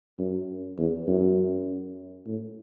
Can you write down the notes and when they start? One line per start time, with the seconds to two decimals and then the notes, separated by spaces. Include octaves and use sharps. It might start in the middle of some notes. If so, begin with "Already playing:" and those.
0.19 F#2
0.78 E2
1.08 F#2
2.26 A2